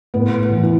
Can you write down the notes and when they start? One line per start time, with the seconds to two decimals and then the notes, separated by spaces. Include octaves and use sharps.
0.14 A2 B3
0.51 E3
0.63 E3